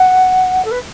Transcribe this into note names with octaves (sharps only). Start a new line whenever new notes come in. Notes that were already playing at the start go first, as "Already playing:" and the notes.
Already playing: F#5
A4
B4